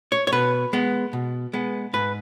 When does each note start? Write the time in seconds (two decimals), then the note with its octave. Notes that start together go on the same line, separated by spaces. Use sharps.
0.12 C#5
0.27 C#5
0.32 B2 B4
0.73 G#3 B3
1.13 B2
1.53 G#3 B3
1.93 G#2 B4